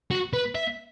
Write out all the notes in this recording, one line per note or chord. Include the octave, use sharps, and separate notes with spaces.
F#4
B4
E5